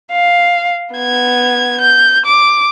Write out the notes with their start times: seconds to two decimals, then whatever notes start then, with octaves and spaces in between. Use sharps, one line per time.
0.12 F5
0.94 B3 G#6
1.81 G6
2.26 D6